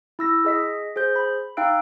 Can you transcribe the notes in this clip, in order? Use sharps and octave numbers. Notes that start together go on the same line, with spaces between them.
E4 E6 A#6
G#4 D#5 B6
G#4 C5 G6
B5
D#4 F5 G5 E6 F#6 D7